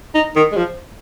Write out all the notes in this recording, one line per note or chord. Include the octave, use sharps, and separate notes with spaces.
D#4
D#3
G#3
F3